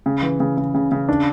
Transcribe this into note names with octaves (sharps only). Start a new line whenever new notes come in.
C#3
E3
C#3
C#3
C#3
C#3
D4